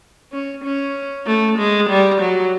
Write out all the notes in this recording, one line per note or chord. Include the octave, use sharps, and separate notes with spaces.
C#4
C#4
A3
G#3
G3
F#3